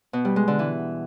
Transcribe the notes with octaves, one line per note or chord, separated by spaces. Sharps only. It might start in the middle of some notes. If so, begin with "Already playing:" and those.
B2
G3
G#3
D3
E3